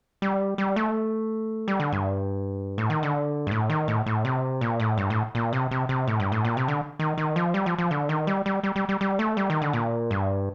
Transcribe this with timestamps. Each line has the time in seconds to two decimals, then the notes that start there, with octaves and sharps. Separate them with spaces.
0.22 G3
0.58 G3
0.76 A3
1.68 G3
1.80 D3
1.93 G2
2.78 A2
2.90 D#3
3.03 D3
3.47 G2
3.51 A2
3.70 D#3
3.88 A2
4.06 A2
4.25 C3
4.61 A#2
4.80 A2
4.98 G2
5.10 A2
5.35 A#2
5.53 C3
5.71 C3
5.89 C3
6.08 A2
6.20 G2
6.32 A2
6.45 A#2
6.57 C3
6.68 D3
6.99 D#3
7.18 D#3
7.36 F3
7.54 G3
7.66 F3
7.78 F3
7.91 D3
8.09 D#3
8.27 G3
8.46 G3
8.64 G3
8.76 G3
8.89 G3
9.01 G3
9.19 A3
9.37 G3
9.50 D#3
9.62 D3
9.73 A#2
10.11 G2